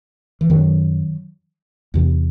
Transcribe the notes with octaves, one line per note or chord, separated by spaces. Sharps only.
E3
F#2 D#3 F#3
E2 C3